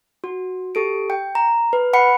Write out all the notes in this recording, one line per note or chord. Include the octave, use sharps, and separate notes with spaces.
F#4
G4 A4 D7
G5
A#5
B4
F#5 B5 C#7